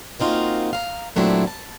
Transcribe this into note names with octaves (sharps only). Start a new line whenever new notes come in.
A#3 C4 D#4 F4 F#4
F5 A#5
A#2 F#3 A3 C4 D4 E4
A5